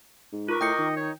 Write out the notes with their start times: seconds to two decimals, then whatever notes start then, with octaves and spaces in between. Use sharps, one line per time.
0.33 G#2
0.48 F4 A#4 B4 C#6 D6
0.61 A2 D#5 G5 G6 C#7
0.79 D#3
0.97 D#4 C#5